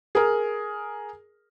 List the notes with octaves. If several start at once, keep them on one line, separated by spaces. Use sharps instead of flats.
G#4 A#4